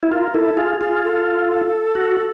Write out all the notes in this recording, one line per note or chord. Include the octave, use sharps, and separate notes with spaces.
E4
F4 A#4
E4 A4
F4 G#4
F4 G#4
A4
F#4